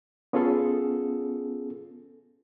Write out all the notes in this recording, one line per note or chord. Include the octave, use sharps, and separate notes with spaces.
B3 C#4 F4 G#4 A4